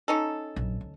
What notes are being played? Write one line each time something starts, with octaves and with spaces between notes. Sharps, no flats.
C#4 D#4 A4
A#1 F#2
D2